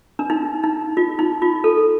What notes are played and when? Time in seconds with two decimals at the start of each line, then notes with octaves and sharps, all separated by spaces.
0.19 D4
0.30 D#4
0.63 D#4
0.97 F4
1.19 D#4
1.42 F4
1.64 A4